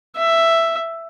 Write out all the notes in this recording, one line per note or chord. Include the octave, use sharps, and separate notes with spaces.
E5